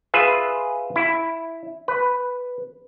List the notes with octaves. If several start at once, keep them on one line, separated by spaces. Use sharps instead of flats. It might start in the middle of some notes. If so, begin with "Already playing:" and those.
F4 G#4 B4 E5
E4
B4